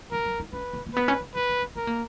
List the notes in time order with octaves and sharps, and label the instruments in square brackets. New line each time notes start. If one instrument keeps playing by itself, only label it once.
[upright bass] F3 [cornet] A#4
[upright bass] F#3
D#4
[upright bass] C#4 [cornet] B4
[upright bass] B3
A#3
[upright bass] B3 [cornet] B4
[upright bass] C#4
D#4
[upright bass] D#4 [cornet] B4
[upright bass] D#4
C#4
[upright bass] B3 [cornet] A#4
[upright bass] A#3